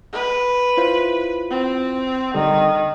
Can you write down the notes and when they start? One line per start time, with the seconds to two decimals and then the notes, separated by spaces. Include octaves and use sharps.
0.12 B4
0.77 E4 F4 C5
1.50 C4
2.34 D3 D#3 G3 A4